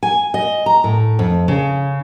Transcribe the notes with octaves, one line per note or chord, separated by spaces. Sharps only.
G#5
D#5
A#5
A2
F2
C#3